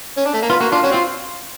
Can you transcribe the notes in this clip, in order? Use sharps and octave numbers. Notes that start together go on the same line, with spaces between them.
C#4
D4
A3
A#3
B3 F4
A#3 F#4
D4 F4
C#4 F#4
C4
F4